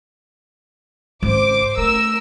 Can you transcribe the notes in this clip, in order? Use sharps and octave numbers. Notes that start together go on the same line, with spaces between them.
G#1 C#3 C5 D6
A3 A#4 E6